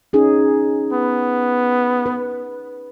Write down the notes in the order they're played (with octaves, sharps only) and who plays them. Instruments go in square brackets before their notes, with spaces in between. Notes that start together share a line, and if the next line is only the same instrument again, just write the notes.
[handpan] C#4 D#4 G#4
[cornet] B3
[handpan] B4